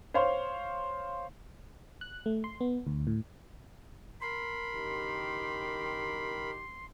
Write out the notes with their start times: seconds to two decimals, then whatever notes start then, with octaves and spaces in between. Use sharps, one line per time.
0.14 C5 C#5 F5 C6
2.01 F#6
2.26 A3
2.44 C6
2.61 B3
2.87 D2
3.07 A2
4.21 A#4 B5 C6
4.74 F#1 D#3 G4